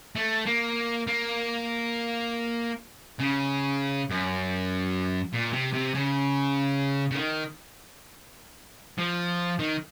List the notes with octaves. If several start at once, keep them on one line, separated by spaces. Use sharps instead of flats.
A3
A#3
A#3
C#3
F#2
A#2
C3
C3
C#3
C#3
D#3
F3
D#3